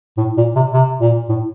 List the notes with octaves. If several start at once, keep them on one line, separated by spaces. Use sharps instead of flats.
A2
A#2
C3
C3
A#2
A2